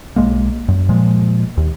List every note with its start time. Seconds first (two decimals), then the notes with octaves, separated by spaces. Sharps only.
0.16 B1 F2 G#3 A#3
0.68 F#2
0.89 A#2 F3 G#3
1.57 D#2